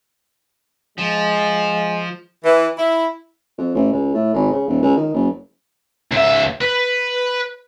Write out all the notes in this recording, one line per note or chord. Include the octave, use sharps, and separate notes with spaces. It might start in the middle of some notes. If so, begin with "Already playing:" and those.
F3 G#3
E3
E4
F2
A1
C#2
A2
G#1
C#3
D#1
C#2
D#3
F#1
C#2 E5
B4